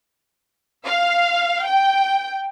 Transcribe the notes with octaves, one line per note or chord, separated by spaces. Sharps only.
F5
G5